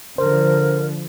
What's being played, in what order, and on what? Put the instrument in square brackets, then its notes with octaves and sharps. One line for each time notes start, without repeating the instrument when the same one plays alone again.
[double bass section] D3 F3 [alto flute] A#4 [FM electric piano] C5